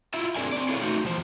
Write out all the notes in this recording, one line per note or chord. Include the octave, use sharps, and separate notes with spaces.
E4 F4 E5
C4 D4 G#4 A#4 D5 G#5
C4 D5
E4 G#4 A4 B4 C#5 F5
A3 D#4 F#4
E2 F3 C5